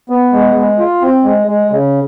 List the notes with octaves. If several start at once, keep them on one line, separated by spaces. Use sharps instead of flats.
B3
G#3
G#3
F4
C4
G#3
G#3
C#3